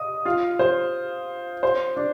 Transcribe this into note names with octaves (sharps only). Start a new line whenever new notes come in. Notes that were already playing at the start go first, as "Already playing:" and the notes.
Already playing: D#5 D#6
F4 F5
C5
C5
D4 D5